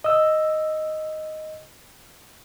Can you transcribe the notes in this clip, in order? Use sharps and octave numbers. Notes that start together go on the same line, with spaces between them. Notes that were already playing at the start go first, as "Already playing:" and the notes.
D#5 E6